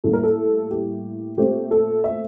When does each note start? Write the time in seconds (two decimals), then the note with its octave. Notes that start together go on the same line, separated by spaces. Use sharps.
0.04 A2 G3 A#3 A4
0.13 A#4
0.23 A4
0.71 G4
1.37 A#2 A3 C4 G4
1.71 A4
2.04 E5